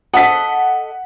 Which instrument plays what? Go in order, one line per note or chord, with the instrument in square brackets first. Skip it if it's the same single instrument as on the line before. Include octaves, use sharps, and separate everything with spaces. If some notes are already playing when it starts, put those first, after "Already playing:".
[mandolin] A4 D#5 [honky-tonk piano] F#5 B6